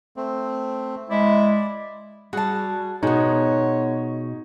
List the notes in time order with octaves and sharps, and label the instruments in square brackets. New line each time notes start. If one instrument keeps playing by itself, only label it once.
[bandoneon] A3 C4
[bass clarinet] G#3 [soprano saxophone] E4 [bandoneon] D5
[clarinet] G3 [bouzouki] F#4 A5 [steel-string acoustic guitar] G#4
[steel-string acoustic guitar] B2 [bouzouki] G#3 B3 [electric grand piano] D#4 [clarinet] C#5